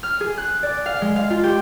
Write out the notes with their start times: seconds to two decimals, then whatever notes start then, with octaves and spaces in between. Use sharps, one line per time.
0.03 F6
0.20 G#4
0.38 F#6
0.63 D5
0.86 F5
1.02 G#3
1.16 F5
1.30 F4
1.43 G4